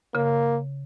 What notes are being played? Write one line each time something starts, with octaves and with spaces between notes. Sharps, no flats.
C#3 A#3